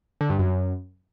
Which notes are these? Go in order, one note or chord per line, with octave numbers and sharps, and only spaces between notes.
D3
G2
F#2